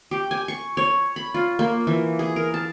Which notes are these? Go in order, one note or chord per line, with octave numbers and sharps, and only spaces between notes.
G4
G#5
C#6
C#5
B5
F4
A#3
E3
G#4
A#4
A5